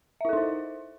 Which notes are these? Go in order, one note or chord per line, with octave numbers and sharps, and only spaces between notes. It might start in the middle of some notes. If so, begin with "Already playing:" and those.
D#4 E4 A4 C5 E5